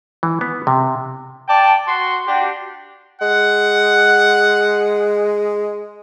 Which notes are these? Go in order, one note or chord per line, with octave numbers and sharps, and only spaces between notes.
E3
B3
C3
D5 G5 A5
F#4 C6
D4 F#4 G4
G#3 F#5